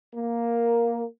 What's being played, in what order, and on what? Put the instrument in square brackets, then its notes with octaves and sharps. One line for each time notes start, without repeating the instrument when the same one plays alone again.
[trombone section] A#3